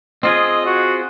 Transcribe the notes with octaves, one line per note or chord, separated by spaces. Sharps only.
C4 F4 G#4 D#5
F#4